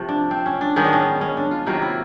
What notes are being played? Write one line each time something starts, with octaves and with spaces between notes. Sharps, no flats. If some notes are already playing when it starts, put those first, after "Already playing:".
Already playing: C3 F3 A3
D4
C4
C#4
D4
D#3 G#3 B3 C#4
D4
C#4
C#4
D4
F4
C3 D#3 F#3 A#3 F4
E4